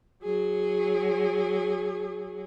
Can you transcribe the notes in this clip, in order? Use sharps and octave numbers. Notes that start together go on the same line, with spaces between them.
F#3 G#4